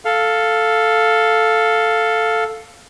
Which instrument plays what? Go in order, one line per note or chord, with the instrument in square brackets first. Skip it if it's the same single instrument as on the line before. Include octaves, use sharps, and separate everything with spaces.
[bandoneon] A4 F5